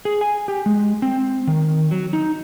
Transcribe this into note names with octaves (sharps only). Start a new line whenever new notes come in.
G#4
G#5
G4
G#3
C4
D#3
F#3
D#4